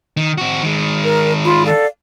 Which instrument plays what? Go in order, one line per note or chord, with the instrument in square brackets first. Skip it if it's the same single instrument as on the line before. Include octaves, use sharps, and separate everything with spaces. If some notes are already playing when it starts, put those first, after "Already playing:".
[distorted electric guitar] D#3
C4 F#4
D#3 G#3
[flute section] A#4
F4 B5
A4 D5 F5